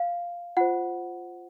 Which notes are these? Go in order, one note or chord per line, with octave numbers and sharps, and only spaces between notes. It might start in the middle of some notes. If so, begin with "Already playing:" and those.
Already playing: F5
F4 C5 F#5